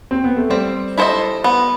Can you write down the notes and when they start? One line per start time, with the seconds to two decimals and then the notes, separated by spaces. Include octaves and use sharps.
0.11 C4
0.24 B3
0.37 A3
0.50 G3 C4
0.98 E4 A4 C5 D#5
1.44 B3